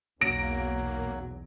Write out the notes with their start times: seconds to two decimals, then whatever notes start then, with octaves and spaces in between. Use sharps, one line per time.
0.21 B1 E2 F#3 A#3 A#6 D7